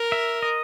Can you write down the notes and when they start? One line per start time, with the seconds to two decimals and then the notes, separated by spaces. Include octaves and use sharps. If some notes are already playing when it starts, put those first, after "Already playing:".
Already playing: A#4
0.12 E5
0.43 D#5